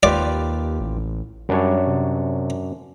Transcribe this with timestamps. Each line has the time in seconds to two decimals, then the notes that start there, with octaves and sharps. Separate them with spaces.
0.03 D#2 F4 G4 B4 D5
0.80 A1
1.49 F#2 G3 D4 C#5
1.87 C3